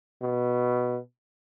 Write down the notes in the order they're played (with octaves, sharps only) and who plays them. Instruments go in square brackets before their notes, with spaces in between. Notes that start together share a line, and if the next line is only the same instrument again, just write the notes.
[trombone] B2